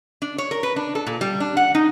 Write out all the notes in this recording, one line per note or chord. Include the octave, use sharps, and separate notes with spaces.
D4
C#5
A#4
B4
D4
A4
A#2
G3
D4
F#5
D#4